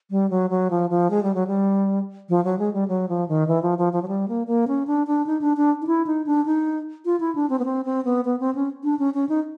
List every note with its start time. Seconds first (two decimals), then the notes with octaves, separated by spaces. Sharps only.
0.11 G3
0.30 F#3
0.50 F#3
0.71 F3
0.90 F3
1.11 G#3
1.23 G3
1.35 F#3
1.47 G3
2.29 F3
2.45 F#3
2.59 G#3
2.74 G3
2.88 F#3
3.09 F3
3.29 D#3
3.48 E3
3.63 F3
3.78 F3
3.93 F3
4.02 F#3
4.08 G3
4.28 A#3
4.47 A#3
4.68 C#4
4.87 D4
5.07 D4
5.27 D#4
5.41 D4
5.57 D4
5.82 D#4
5.87 E4
6.06 D#4
6.26 D4
6.46 D#4
7.05 F4
7.20 E4
7.35 D4
7.50 C4
7.59 B3
7.65 C4
7.85 C4
8.05 B3
8.25 B3
8.40 C4
8.55 C#4
8.84 D4
8.99 C#4
9.14 C#4
9.29 D#4